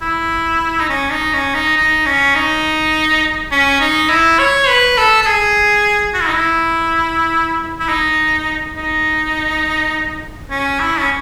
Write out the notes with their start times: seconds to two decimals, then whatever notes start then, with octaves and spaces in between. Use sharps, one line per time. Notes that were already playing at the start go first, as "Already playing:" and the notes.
0.02 E4
0.80 D#4
0.89 C#4
1.11 D#4
1.33 C#4
1.54 D#4
1.77 D#4
2.06 C#4
2.35 D#4
3.51 C#4
3.80 D#4
4.10 E4
4.39 C#5
4.68 B4
4.97 A4
5.22 A4
5.26 G#4
6.14 F#4
6.21 E4
6.28 D#4
6.35 E4
7.80 E4
7.89 D#4
8.76 D#4
10.51 C#4
10.80 E4
10.99 C#4